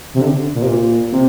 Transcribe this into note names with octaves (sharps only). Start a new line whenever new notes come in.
C3
D3
A#2
C3
A#2
C3